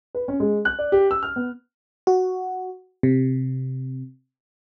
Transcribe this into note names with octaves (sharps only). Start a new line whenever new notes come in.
B4
C#4
G#3
F#6
D5
G4
E6
F6
B3
F#4
C3